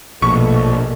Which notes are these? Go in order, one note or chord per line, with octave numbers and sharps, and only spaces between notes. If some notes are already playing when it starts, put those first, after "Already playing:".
A#1 B2 A3 C#6